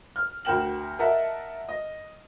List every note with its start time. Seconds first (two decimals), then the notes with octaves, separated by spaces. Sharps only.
0.16 F6
0.45 D2 F#4 A#4 G5 E7 F#7
0.99 A#4 D#5 E5 F#5 A5
1.69 D#5